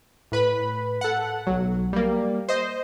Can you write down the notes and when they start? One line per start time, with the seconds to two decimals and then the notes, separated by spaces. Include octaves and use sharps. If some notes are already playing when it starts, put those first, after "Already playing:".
0.32 A2 B4 B5
1.01 A4 F#5
1.47 B1 F#3
1.93 G3 A#3
2.49 C5 D#5